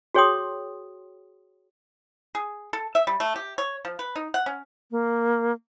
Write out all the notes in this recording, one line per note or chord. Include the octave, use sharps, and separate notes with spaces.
F#4 G#4 C#5 G5 C6 D#6
G#4
A4
E5
G3
A3
G4
C#5
F3
B4
D#4
F#5
C#4
A#3